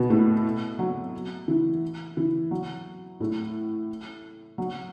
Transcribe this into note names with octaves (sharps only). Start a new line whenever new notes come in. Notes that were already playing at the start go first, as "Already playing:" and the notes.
Already playing: B2 B3
A2 A3
F#3
E3
E3
F#3
A2 A3
F#3